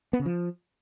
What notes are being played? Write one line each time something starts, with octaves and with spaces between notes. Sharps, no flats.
B3
C#3
F3